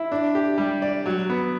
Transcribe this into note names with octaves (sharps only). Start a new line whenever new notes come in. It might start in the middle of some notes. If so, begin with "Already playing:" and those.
Already playing: E4
D4
G4
G3
D5
F#3
B3